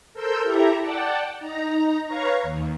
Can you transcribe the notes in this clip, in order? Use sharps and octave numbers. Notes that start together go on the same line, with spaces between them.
A4 A#4 C5 E6 G6
E4 G4 A4 E5 A#5
D5 F#5 G5 A5
D#4 A#5
B4 C#5 F5 A#5 C#6
D#2